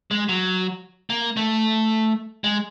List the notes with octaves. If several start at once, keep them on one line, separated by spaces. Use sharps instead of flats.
G#3
F#3
A#3
A3
G#3